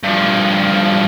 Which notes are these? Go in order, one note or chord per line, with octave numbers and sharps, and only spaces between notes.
G2 F3